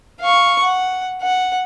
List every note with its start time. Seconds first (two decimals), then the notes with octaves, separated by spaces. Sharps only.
0.20 F5 C#6
0.63 F#5
1.22 F#5